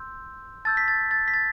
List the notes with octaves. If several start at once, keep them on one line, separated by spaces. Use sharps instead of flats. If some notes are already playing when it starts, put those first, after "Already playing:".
Already playing: C6 E6 G6
A5 E6 G6 A6
B6
A6
A6
B6
A6